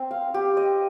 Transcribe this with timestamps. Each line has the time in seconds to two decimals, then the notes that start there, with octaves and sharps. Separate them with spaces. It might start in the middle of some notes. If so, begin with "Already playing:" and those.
Already playing: C4 C5
0.11 F5
0.34 G4
0.57 D#5